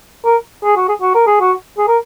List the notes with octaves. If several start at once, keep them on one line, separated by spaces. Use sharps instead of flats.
A#4
G#4
F#4
G#4
F#4
A#4
G#4
F#4
G#4
A#4